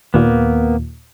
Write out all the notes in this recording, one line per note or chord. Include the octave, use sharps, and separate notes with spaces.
D#2 A#2 A#3 B3